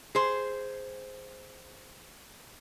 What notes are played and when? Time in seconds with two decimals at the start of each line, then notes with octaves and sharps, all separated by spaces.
0.15 G#4 C5